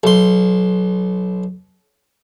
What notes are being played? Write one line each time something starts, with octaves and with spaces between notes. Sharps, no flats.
B1 C6